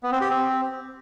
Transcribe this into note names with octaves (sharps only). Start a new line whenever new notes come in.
B3
C4
G4
C4